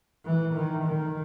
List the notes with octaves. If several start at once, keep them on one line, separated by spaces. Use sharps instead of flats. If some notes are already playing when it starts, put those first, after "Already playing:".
E3
D#3
D#3